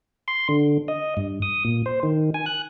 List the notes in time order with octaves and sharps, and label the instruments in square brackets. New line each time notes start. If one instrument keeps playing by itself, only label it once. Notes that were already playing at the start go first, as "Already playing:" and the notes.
[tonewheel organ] C6
D3
D#5
G2
D#6
A#2
C5
D#3
G#5
F#6